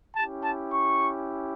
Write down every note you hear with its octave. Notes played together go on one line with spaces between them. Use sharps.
C#4 E4 G4 A5
A5
C#6